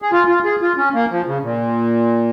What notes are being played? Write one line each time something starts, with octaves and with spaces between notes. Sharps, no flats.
G#4
F4
F4
G#4
F4
C#4
A#3
F3
C#3
A#2